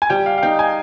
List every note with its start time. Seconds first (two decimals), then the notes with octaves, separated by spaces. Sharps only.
0.02 G#5
0.10 G3 G5
0.26 F5
0.38 F5
0.42 D#4 G5
0.59 G#5